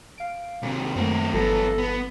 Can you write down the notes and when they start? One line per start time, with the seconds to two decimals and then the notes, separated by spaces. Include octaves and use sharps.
0.18 F5 D7
0.63 D#2 C3
0.95 F#2 D#3 A3 A#3 C4
1.33 G1 F#2 E3 B3 A4 A#6
1.78 B3